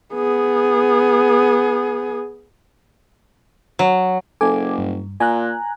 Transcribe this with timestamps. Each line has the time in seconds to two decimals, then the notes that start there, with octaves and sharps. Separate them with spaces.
0.14 B3 G#4
3.79 F#3
4.41 F#1 A4 G#5 D6
4.78 G2
5.20 A#2 G#5 A#5 F#6